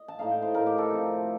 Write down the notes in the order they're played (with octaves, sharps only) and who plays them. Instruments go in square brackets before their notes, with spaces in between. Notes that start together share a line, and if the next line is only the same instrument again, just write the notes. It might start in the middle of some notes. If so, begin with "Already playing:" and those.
Already playing: [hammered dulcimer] D#5
A5
A2 A3 D#4 F5
G5
C5
A2 A3 D#4 A#4
G4
A4
C3 F3 C4